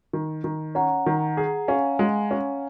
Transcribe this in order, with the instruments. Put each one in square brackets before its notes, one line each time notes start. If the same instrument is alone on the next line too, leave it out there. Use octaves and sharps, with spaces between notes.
[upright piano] D#3
D#3
[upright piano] C#4 [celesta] F#5 A#5
[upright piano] D#3
G#4
[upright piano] C#4 [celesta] F5 G#5
[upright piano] G#3
C#4